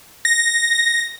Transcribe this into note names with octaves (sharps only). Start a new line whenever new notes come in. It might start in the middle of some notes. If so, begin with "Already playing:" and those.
A#6